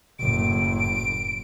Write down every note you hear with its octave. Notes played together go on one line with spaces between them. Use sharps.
F#1 A2 D7